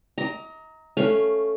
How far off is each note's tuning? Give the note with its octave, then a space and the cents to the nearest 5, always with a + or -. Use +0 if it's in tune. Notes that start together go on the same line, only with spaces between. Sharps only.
D#5 +40 A#5 +0 D6 +15
A3 -5 C#4 +0 F5 +0